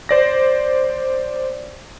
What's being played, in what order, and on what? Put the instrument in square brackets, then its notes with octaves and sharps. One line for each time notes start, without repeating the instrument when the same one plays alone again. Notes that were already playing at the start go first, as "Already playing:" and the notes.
[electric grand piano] C5 D5 A#6